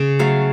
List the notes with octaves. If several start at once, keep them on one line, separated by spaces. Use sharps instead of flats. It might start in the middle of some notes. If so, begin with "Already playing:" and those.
Already playing: C#3
F#3 A3 F5